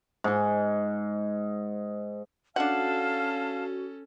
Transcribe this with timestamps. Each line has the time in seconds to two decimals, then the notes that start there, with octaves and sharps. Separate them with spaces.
0.24 G#2 D#5
2.56 C#4 D4 F#4 A4 F5 F#5 A5 F6